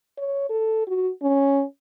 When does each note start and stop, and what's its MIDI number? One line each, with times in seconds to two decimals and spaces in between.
0.18 0.48 73
0.50 0.86 69
0.87 1.10 66
1.22 1.63 61